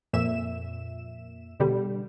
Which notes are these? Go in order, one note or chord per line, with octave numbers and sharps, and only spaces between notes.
F2 A#2 E5 E7
B2 D3 G3